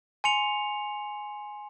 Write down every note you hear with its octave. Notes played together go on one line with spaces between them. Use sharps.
G#5 C6 C#7 F7